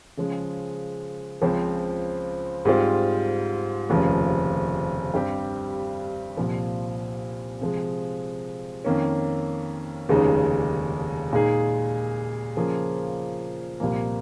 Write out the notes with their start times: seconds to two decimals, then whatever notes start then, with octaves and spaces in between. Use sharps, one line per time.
0.17 C#3 F3 G#3
1.41 C#2 C#3 F3 C4
2.65 G#2 G3 C4 F4
3.89 F1 D#2 C#3 F3
5.14 G2 G3 C4 G4
6.37 C2 A#2 F3
7.61 C3 F3 G#3
8.84 F2 D#3 A#3 C#4
10.09 F1 D#2 C#3 G#3 D#4
11.33 A#2 G#3 D#4 G#4
12.57 C#3 F3 A#3 F4 G#4
13.80 C2 A#2 F3 A#3